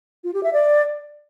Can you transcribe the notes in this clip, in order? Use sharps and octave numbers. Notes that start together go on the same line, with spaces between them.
F4
G4
E5
D5